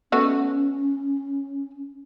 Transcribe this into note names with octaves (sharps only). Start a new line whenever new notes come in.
A3 B3 C#4 F#4